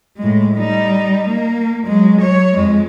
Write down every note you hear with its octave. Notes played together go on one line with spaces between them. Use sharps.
A2 G#3
G3 D#4
A#3
F#3 G#3
F#3 C#5
F2 G#3